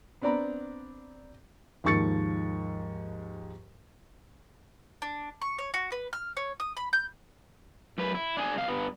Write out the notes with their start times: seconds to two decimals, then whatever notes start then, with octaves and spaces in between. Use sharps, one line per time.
0.22 B3 C4 D4 D5 A#5 B5
1.84 D#2 G#2 F3 C#6 A6 C#7
5.02 D4
5.42 C#6
5.58 C#5
5.74 F#4
5.92 B4
6.13 F6
6.37 C#5
6.60 D#6
6.77 B5
6.93 G6
7.98 F#2 B4
8.15 E4
8.37 D4 G#4
8.55 C2 F5
8.68 G2 B3